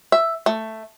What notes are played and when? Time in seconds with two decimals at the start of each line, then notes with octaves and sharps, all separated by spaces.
0.12 E5
0.46 A3